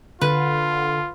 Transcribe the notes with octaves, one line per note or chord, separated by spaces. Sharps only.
D3 F4 B4